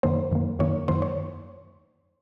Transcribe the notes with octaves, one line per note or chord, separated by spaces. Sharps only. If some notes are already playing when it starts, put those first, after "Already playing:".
F#2 D#3 A#3 C5
F#2 D#3 A#3
F#2 D#3 A#3 C#5
F#2 D#3 A#3 C5
C#5